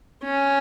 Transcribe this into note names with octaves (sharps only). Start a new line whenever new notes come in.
C#4